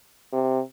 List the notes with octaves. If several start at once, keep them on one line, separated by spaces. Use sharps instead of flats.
C3